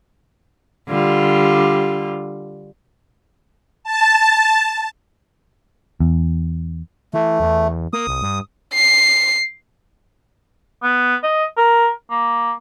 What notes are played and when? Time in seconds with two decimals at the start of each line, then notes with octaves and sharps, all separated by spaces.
0.89 D3 G3 F4
3.83 A5
6.00 E2
7.14 E3 A3
7.40 E2
7.93 A#3 D#6
8.07 C2
8.22 G2
8.73 C7
10.83 B3
11.23 D#5
11.57 A#4
12.11 A#3